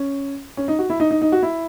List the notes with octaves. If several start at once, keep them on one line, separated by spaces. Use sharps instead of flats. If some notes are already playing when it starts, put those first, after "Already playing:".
Already playing: C#4
C#4
D#4
F#4
E4
D#4
D#4
D#4
F#4
E4